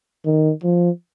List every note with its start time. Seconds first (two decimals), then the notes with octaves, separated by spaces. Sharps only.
0.25 D#3
0.64 F3